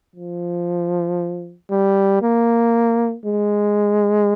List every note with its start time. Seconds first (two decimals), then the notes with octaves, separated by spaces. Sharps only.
0.16 F3
1.71 G3
2.23 A#3
3.26 G#3